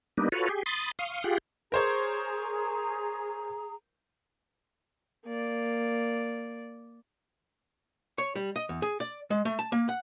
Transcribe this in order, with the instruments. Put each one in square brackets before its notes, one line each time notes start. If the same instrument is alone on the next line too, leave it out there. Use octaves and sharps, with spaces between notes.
[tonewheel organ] G3 A#3 B3 D4 D#4
F4 F#4 A4 B4 C#5
G4 G#4
B5 C6 D#6 A6
F5 C6 C#6 D#6
F4 G4 G#4 F#5 G5
[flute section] G#4 A#5 [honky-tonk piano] A#4 C5 C#5
[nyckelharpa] A#3 D5
[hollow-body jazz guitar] C#5
G3
D#5
E2
G#4
D5
G#3
A3
A5
A#3
F#5